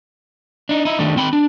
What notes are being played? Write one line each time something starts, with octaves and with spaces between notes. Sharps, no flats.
D4 D#4
D#4 E4
D#3 G3 A3 D4
D#3 C4 G5 B5
D4